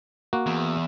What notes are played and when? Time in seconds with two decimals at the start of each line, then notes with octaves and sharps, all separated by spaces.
0.33 A#3 F#4
0.46 E2